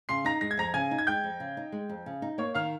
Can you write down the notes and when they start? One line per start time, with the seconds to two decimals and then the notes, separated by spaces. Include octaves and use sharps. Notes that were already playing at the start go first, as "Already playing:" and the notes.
0.09 C#3 C6 C7
0.25 D#4 A#5 A#6
0.41 G#3 A#6
0.51 G#6
0.57 F2 A#5 A#6
0.74 C#3 G#5 G#6
0.91 D#4
0.98 G#6
1.07 G#3 G5 G6
1.24 F2
1.40 C#3
1.57 D#4
1.72 G#3
1.89 F2
2.06 C#3
2.22 D#4
2.38 A#3 C#5 C#6
2.54 D#3 F5 F6